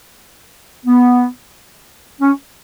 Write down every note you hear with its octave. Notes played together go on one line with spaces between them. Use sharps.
B3
C#4